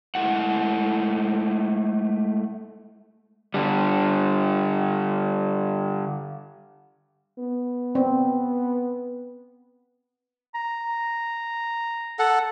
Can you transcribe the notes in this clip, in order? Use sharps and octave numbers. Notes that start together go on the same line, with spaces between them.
G#3 A3 E4 F#5
D3 G3
B3
C4
A#5
A4 F#5